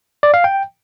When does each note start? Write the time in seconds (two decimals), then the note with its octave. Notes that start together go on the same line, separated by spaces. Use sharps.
0.23 D5
0.34 F5
0.44 G5